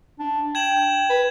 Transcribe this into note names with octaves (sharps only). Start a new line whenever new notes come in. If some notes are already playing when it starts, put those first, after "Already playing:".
D4
G5 G#6 E7 F#7
B4